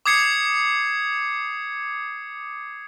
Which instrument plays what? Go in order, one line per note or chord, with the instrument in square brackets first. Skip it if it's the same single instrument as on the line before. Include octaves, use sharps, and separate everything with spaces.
[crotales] D6 D#6 G#6 C7 C#7